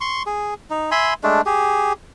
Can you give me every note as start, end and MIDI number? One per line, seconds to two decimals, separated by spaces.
0.01 0.23 84
0.01 0.23 85
0.26 0.54 68
0.70 0.90 63
0.91 1.14 76
0.91 1.14 80
0.91 1.14 83
0.91 1.14 84
1.24 1.41 56
1.24 1.41 57
1.24 1.41 62
1.46 1.93 67
1.46 1.93 68